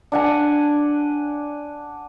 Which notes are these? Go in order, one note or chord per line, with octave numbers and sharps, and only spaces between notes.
D4 F#5 G#5